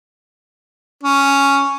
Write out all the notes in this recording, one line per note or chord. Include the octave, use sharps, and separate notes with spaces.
C#4